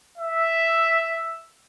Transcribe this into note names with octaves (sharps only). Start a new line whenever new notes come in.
E5